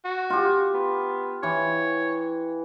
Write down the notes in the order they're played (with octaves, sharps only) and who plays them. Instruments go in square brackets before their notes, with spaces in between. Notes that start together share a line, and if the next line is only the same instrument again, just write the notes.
[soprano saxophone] F#4
[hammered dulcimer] F4 G4
[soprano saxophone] B3
[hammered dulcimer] E3 [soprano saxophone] C#5